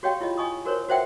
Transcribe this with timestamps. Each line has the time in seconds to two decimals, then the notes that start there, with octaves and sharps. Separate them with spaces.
0.03 F#4 G4 C#5 D#5 F5 G5
0.21 E4 F4 G#4 D#5
0.38 D#5 G#5 C#6 D#6
0.65 F#4 A#4 C5 C#5
0.88 F#4 B4 C5 E5 F#5 G5